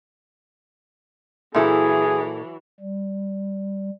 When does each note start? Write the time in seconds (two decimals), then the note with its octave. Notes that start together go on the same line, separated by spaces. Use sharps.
1.54 A#2 E3 F#3 E4 G#4 A4
2.80 G3